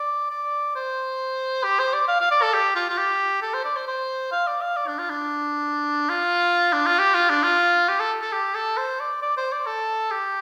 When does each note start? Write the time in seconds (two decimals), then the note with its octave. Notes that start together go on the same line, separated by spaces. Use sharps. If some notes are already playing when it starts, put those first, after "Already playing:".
Already playing: D5
0.30 D5
0.75 C5
1.64 G4
1.79 C5
1.93 D5
2.08 F5
2.20 F5
2.31 D5
2.42 A4
2.53 G4
2.75 F4
2.89 F4
2.98 G4
3.42 A4
3.54 C5
3.65 D5
3.76 C5
3.87 C5
4.32 F5
4.47 D5
4.61 F5
4.76 D5
4.87 D4
4.99 F4
5.10 D4
6.09 F4
6.73 D4
6.86 F4
6.99 G4
7.14 F4
7.30 D4
7.43 F4
7.89 G4
8.00 A4
8.22 A4
8.32 G4
8.55 A4
8.77 C5
9.00 D5
9.22 D5
9.37 C5
9.52 D5
9.66 A4
10.11 G4